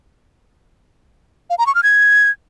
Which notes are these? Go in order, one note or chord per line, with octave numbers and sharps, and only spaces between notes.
F5
A#5
C#6
F6
G#6